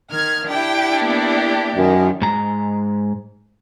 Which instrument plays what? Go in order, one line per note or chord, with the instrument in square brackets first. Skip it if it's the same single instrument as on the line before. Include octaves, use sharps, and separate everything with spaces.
[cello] D#3 [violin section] F6 G#6
[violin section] D4 E4 G4 [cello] G5
[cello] A#3 B3
[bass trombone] F#2 [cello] D#3
[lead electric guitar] G#2 A#5